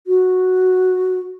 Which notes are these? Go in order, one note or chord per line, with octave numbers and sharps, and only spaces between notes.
F#4